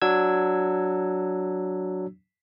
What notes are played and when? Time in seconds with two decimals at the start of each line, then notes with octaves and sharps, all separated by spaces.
0.02 F#3 D4 E6 G#6